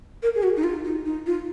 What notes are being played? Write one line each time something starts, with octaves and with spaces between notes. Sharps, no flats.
A#4
G#4
F#4
D#4
F4
D#4
D#4
F4